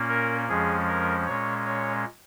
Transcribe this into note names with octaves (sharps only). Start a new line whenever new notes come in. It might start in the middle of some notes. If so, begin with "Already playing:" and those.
Already playing: A#2 A#3 C#4
A#4
F2 F3 G#3 C#4 G#4
A#4
A#2 G#3 C#4 C#5
C#5